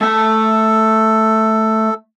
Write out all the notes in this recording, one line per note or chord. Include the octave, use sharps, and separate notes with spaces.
A3 A4 A5